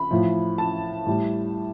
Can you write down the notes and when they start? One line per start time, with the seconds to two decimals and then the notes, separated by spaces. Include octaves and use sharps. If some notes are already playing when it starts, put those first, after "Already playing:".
Already playing: B5
0.11 A2 F3
0.58 A5
1.07 A2 G3